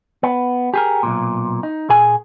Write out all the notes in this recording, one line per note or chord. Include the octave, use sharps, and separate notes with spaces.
B3
G4 G#4 A#4
B1 F2 A#2
D#4
A#2 G#4 G#5